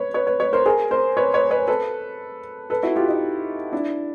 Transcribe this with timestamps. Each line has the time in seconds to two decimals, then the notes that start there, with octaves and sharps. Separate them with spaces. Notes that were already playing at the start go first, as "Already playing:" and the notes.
Already playing: B4 C#5
0.14 B4 C#5
0.27 B4 C#5
0.40 B4 C#5
0.53 A#4 C5
0.66 G#4 A#4
0.91 A#4 C5
1.17 B4 C#5
1.34 B4 C#5
1.51 B4 C#5
1.68 A4 B4
2.70 A4 B4
2.83 E4 F#4
2.96 F4 G4
3.08 D#4
3.72 D4 E4